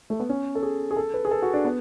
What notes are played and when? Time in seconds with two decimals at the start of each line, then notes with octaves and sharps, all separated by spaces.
0.10 A3
0.20 B3
0.29 C#4
0.55 A4
0.63 G#4
0.91 G#4
0.96 A4
1.14 B4
1.25 G#4
1.31 A4
1.42 F#4
1.53 D4
1.65 B3